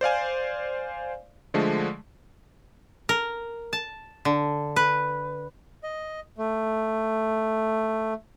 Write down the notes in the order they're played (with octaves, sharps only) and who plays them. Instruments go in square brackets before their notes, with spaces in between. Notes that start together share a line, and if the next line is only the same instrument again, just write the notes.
[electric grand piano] C5 D5 F5 G#5
D3 F3 G#3 A3
[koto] A#4
A5
D3
B4
[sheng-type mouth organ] D#5
A3